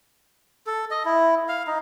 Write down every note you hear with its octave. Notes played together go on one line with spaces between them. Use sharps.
A4
D#5
E4
F5
D#4